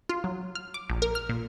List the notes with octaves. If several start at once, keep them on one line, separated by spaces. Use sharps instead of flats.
F4
F#3
F6
D6
A#1
A#4
F6
A#2